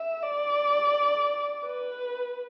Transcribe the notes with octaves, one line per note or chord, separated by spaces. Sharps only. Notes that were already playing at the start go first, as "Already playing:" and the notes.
Already playing: E5
D5
B4